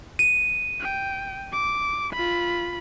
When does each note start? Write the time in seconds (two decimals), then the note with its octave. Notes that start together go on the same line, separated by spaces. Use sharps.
0.19 D#7
0.80 G5
1.52 D6
2.13 F4 B5